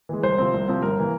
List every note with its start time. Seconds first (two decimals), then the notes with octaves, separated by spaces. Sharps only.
0.09 E3 G#3
0.23 C2 C5
0.38 C3 F3 C4
0.54 C2
0.68 C3 F3 C4
0.82 G1 A#4
0.99 E3 A#3